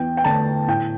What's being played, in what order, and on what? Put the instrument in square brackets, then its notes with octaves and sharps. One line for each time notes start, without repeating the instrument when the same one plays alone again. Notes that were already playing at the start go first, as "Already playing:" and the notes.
Already playing: [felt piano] E2 G5
G5
D3 A3 A5
A2 G5